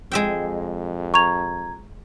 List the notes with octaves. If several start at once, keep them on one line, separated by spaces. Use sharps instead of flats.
F2 G#3 E5 G5
A#5 C#6 G#6 F7